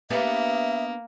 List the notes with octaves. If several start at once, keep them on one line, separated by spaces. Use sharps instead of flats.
A#3 B3 D4 G4 E5